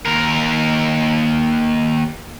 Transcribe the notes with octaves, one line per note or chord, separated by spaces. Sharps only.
D#2 A#4